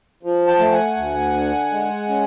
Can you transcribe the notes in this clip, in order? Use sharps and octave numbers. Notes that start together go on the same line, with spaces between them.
F3
G5 A5
A3
F#5 G#5
D2
D3
G#3
C#4